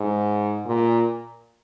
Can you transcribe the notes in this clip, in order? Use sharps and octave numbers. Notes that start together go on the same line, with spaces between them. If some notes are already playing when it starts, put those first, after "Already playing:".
Already playing: G#2
A#2